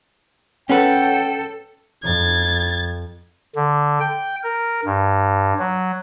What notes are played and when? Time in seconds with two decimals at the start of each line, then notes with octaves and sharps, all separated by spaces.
0.69 C#4 A4 B4 F#5 G5
2.03 F2 G#6 A6
3.56 D3
4.00 G5
4.43 A#4
4.85 G2
5.59 F#3